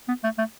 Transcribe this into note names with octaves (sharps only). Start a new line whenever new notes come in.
B3
A3
A3